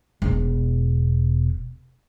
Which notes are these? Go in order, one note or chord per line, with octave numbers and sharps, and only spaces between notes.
E1 B2